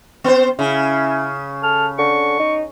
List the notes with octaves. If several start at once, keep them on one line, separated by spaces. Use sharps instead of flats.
B3 C5
C#3 C#4 E4
A4 F6
D3 C#6
D#4